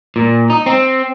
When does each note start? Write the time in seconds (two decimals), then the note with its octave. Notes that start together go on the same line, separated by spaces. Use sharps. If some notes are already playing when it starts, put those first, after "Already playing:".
0.16 A#2
0.50 D#4
0.66 C4